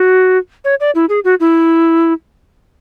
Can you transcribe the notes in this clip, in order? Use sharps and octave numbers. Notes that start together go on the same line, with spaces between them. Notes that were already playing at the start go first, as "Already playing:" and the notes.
Already playing: F#4
C#5
D5
E4
G#4
F#4
E4